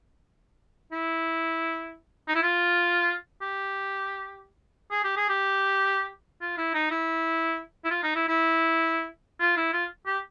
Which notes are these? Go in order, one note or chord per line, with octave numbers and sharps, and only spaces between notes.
E4
D#4
E4
F4
G4
G#4
G4
G#4
G4
F4
E4
D#4
E4
E4
F4
D#4
E4
E4
F4
E4
F4
G4